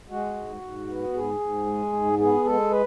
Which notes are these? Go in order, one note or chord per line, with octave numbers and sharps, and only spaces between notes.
G#3 F#4
G#2
G#2
B3
G#2 G#4
G#2
G#3
G#2
B3 G#4
G#3 A4
B4